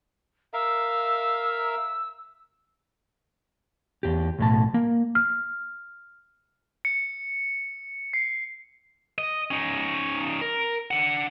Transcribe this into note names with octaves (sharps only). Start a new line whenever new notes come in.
A#4 E5 F5 E6
E2 G4
B1 A2 A5
A#3
F6
C#7
C7
D#5
C#4 D#4
A#4
D4 F#5